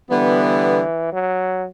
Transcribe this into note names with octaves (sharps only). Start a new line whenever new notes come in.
D3 E3 G3 B3
F#3